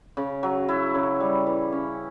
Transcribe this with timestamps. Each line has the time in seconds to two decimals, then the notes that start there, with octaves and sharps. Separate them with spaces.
0.17 C#3
0.43 F#3
0.69 E4
0.95 C#3
1.20 G3
1.47 E3
1.72 C#4